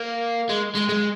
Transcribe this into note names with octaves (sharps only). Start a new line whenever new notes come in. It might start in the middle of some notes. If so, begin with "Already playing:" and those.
Already playing: A#3
G#3
G#3
G#3